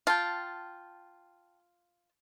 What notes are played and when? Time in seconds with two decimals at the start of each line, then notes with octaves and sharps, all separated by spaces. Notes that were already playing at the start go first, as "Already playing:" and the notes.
0.07 F4 G5 A5